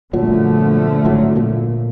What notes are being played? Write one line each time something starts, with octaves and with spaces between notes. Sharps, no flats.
G1 A#2 D3 F3 F#3 A3
G#1 A2 F#3
A#2 A#3